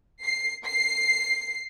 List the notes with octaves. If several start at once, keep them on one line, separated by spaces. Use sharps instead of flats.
C7
C7